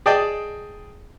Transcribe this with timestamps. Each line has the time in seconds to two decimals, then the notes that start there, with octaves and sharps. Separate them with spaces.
0.06 G#4 D5 D#5 G5 A5